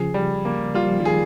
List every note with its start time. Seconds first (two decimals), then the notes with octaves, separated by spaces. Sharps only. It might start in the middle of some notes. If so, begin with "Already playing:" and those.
Already playing: C#3 F3 G#4
0.14 G3
0.45 A#3
0.74 G3 F4
0.87 F3
0.99 D#3 G3
1.05 G#4